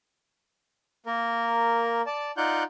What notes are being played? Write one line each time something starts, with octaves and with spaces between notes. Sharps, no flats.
A#3 A#4
D5 A5
D#4 F4 D5 F#5 F#6 G6